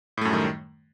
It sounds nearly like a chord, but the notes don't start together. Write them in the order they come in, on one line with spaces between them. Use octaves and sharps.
A2 A3 F#2 G3 D#3